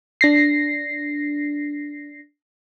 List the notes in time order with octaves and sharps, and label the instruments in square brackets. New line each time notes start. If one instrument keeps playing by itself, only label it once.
[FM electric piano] D4 A#6 C7